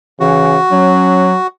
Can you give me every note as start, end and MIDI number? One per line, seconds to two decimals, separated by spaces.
0.20 0.57 49
0.20 0.60 52
0.20 1.47 66
0.71 1.36 54
0.71 1.30 61